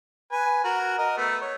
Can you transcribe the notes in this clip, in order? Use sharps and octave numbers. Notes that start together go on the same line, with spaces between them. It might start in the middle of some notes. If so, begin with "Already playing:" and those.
B4 G#5
F#4 A#4
A#4 D#5
A3 B3
C#5